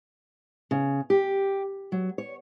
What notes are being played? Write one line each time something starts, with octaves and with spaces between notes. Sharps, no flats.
C#3
G4
F#3
C#5